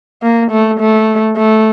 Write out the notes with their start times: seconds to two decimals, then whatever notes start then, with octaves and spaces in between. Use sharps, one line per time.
0.23 A#3
0.51 A3
0.80 A3
1.37 A3